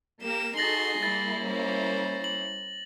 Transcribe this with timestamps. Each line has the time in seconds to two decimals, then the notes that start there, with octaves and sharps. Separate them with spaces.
0.22 A#3 G4 A#4 E7
0.57 D#4 F#4 G#4 A4 C6 A6 A#6 F#7
1.03 G3 A#3 E4 A6
1.43 C#4 C5
2.24 F#7